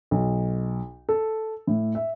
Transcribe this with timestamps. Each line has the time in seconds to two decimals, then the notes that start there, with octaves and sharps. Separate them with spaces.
0.11 B1
1.09 A4
1.67 A2
1.95 E5